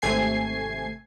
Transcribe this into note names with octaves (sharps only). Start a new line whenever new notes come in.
G#1 C3 A3 G#5 G#6 C7